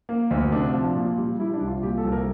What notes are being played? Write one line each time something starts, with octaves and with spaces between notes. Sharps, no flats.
A#3
D2
C3 D4
F3
A#2
G3
G3 E4
D4
C2
F4
A#2 G4
A4
C2
A#4